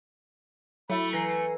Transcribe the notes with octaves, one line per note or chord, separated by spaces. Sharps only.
F#3 A3 E4 B5
E3 G#5 A#5 A#6 C7